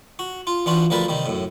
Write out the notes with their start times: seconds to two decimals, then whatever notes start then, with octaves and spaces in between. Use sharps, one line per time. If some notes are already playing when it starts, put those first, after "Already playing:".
0.19 F#4
0.47 F4
0.66 E3 D4 F4 F#4
0.90 D2 F3 G3 A#4 B4 A5
1.08 C3 D#3 G3
1.26 F#2 A2